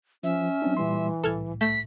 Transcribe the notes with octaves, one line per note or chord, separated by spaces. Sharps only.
F3 C#4 E5
F#3 C4 D4
A#2 E3 G3 C6
C2 A2 A4 F6 G#6
A3 G6 B6